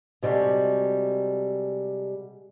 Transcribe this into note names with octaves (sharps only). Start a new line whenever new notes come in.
C3 G3 G#3 F#4 A4